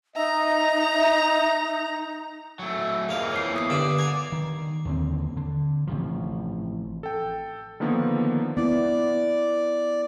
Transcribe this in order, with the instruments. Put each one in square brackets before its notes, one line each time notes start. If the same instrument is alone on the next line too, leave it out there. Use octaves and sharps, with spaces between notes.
[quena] D#4 [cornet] D#5 [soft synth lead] E5 [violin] A#5
[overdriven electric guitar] F#3 A3
[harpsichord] F2 F5 [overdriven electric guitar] G#3 A#3
[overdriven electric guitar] E3 A#3 [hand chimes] C#5 C7
[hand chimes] B3 D#6 C7
[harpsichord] G2 D3 B5 [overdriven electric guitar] D5
[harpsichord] G#5 A#5
[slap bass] D#3
D#2 D3 A3 C4
D3
A1 C3 F3
[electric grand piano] A4 G5
D3 D#3 F3 A#3 B3
[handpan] B3 E4 [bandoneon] D5